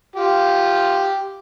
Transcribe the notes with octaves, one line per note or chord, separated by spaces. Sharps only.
F4 G4